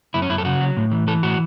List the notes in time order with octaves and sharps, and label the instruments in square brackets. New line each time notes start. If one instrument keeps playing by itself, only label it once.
[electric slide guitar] F#2 E4
C#4
F#2 E4
A4
C#3 F#4
F#3
A2
E3
E3 A4
A2 F#4